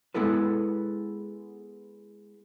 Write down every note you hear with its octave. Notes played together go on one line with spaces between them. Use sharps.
G#3 B3 E4 A4 B4